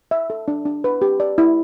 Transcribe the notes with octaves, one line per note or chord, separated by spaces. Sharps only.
E5
A4
D4
D4
B4
G4
D5
E4